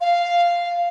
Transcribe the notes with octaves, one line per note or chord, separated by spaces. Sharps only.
F5